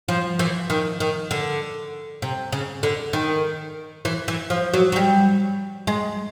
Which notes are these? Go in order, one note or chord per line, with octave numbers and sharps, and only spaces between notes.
F3
E3
D#3
D#3
D3
C3
C#3
D3
D#3
E3
E3
F3
F#3
F#3
G3
G#3